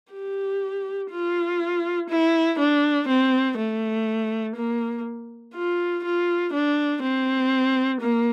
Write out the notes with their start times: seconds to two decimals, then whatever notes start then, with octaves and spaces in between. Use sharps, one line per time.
0.13 G4
1.11 F4
2.10 E4
2.59 D4
3.08 C4
3.57 A3
4.56 A#3
5.55 F4
6.04 F4
6.53 D4
7.02 C4
8.01 A#3